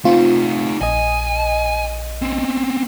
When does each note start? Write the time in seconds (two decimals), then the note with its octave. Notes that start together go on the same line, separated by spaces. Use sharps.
0.05 A3 C4 D#4 F4
0.81 A#1 D#5 G#5
2.22 C4 C#4